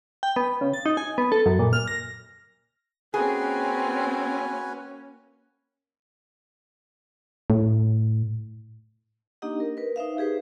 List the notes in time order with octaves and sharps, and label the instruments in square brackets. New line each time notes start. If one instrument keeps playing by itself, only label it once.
[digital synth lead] G5
B3
C#3
A6
D#4
G#5
B3
A4
F#2
A#2
F6
A#6
[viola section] A#3 C#4 [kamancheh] C4 [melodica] F#4 B4 G#5 [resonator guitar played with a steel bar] G#4
[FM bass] A2
[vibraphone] A#3 D4 D#4 G4 D#5 F#5
A#4
A#4 B4
D#4 C5 E5 F5
D#4 G4 G#4 B4 C5